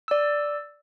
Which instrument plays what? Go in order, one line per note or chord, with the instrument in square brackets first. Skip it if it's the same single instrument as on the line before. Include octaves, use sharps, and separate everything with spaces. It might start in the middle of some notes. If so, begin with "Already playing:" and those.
[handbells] D5 E6